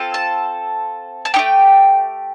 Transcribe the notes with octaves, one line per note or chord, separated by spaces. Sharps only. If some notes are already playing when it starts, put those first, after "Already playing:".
Already playing: C4 F4 A4
A5
A5
A3 D#4 G4 G5